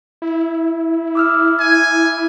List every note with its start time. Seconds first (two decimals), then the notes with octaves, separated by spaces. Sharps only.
0.22 E4
1.15 D6 E6 F6
1.60 G#5